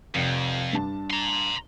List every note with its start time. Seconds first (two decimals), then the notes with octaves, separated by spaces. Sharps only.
0.15 F1 F2
0.73 G2 D4 A5
1.11 A#5 C6